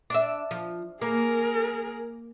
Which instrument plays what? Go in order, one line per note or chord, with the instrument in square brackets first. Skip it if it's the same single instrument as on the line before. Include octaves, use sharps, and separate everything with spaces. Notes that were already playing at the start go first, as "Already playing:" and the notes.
[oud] D4 E5
F3
[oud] A#3 [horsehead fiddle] G#4 A#4